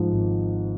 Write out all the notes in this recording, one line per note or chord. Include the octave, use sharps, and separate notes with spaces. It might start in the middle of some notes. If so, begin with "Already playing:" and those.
Already playing: G#2 F3
G#1